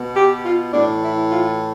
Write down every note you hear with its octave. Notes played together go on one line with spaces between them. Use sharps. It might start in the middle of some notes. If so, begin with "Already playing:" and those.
Already playing: B2
G4
F4
A2 E3 D4
E4
F4